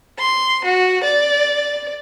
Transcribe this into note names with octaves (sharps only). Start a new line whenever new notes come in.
C6
F#4
D5